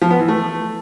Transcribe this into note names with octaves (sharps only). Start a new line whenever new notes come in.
F3
B3
E3
A3